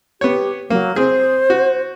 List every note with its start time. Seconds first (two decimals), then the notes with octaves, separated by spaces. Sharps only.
0.21 B3 G4 C#5
0.70 F#3 A#3
0.96 C4 G#4 C5
1.50 F#4